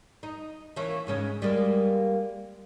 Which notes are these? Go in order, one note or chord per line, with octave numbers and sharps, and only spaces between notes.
D#4
E3 A#3 C#4
G#2 C#3 C#4
G3 G#3 A#3